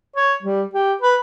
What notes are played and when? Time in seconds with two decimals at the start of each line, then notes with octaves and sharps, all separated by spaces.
0.16 C#5
0.43 G3
0.73 G4
1.01 B4